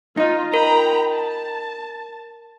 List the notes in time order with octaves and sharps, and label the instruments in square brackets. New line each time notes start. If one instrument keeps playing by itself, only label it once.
[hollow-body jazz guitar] D#4 D#5 [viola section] F4
[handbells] A#4 [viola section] G5 A#5 B5
[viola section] A5